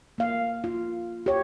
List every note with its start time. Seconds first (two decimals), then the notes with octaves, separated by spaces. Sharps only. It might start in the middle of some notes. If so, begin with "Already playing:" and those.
0.18 A#3 F5
0.64 F4
1.26 G4 C#5